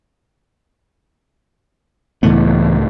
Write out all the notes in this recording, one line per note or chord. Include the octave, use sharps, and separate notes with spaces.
C#2 A2 E3 A3 B3